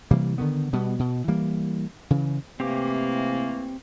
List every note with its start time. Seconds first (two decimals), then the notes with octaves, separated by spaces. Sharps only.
0.11 C3 E3 G3 A#3
0.38 D3 D#3 B3
0.73 B2 G3 B3
0.99 B2
1.28 E3 G3 A#3
2.10 C#3 E3
2.60 C3 E3 A3 A#3 C4 G4 D6